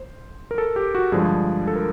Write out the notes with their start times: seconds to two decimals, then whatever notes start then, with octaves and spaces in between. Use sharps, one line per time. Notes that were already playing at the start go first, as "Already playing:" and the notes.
Already playing: C5
0.51 A#4
0.58 A4
0.76 G4
0.95 F#4
1.12 G2 D3 F3 G#3 G#4
1.67 A4
1.75 A#4